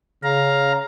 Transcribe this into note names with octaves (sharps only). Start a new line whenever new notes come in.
C#3 F5 A#5